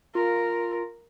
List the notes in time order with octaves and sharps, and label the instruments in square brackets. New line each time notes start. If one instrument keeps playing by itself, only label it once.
[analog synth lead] F4 [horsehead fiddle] A#4